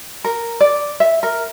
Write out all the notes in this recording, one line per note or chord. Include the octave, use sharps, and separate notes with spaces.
A#4
D5
E5
A#4